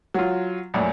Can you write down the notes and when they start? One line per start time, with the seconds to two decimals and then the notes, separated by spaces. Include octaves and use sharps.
0.14 F#3 F4
0.74 A#1 F#2 A2